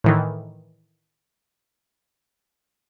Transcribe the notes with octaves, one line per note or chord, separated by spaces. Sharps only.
A2 D#3 E3